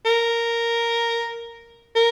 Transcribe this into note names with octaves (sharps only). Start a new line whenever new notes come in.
A#4
A#4